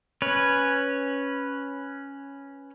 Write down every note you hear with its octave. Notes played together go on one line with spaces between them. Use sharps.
C#4 B4 C#5